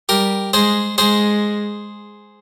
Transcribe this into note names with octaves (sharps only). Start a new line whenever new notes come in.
G3 G4 A#4
G#3 G#4 C5
G#3 G#4 C5